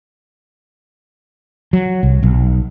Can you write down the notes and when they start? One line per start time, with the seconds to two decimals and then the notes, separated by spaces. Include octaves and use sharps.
1.73 F#3
2.03 C2
2.23 B1